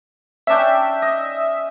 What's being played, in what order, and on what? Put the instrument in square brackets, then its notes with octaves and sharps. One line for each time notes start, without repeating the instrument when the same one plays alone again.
[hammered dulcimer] C#4 D4 G5 [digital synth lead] E5
[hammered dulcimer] D#5